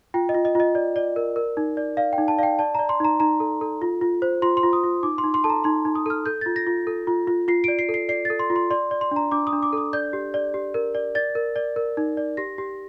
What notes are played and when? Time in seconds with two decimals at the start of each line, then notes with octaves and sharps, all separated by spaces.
0.14 F4 G5
0.29 D#5
0.34 F4
0.45 D#5
0.55 F4 D#5
0.75 D5
0.96 D5
1.16 A#4
1.36 A#4
1.57 D#4
1.77 D5
1.97 D5 F5
2.13 G5
2.18 D#4
2.28 A5
2.38 D5 F5
2.43 G5
2.59 D5 A5
2.75 A#5
2.79 D5
2.89 C6
3.00 D#4 A#5
3.20 D#4 A#5
3.40 A4
3.61 A4
3.82 F4
4.01 F4
4.22 C5
4.42 F4 C6
4.57 C6
4.63 F4
4.73 D#6
4.84 F4
5.03 D#4 D6
5.18 C6
5.24 D#4
5.34 C6
5.44 A4 A5
5.50 A#5
5.64 D#4 C6
5.85 D#4
5.95 D#6
6.06 A4 F6
6.26 A4 G6
6.41 A6
6.46 F4
6.56 A#6
6.67 F4
6.87 A4
7.07 F4
7.27 F4
7.48 F4 C7
7.64 D7
7.68 D5
7.79 C7
7.89 A4
7.94 C7
8.09 D5 C7
8.25 A6
8.30 A4
8.39 C6
8.50 F4
8.56 C6
8.71 D5 C6
8.91 D5
9.01 C6
9.11 D4 A#5
9.32 D4 D6
9.47 D#6
9.53 D4
9.62 D6
9.73 A4 D#6
9.93 D5 G6
10.13 G4
10.34 D5
10.54 G4
10.74 A#4
10.95 D5
11.15 D5 A6
11.35 A#4
11.56 D5
11.76 A#4
11.97 D#4
12.17 D5
12.37 G4 A#6
12.58 G4